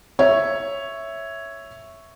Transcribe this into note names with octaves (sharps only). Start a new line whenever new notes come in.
C#5 E5